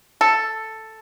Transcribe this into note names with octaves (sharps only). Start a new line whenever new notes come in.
A4